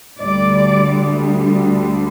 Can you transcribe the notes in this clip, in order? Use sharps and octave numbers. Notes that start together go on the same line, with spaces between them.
D2 D3 G3 D5